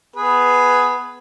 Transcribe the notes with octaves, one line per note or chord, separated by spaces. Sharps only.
B3 G#4 B4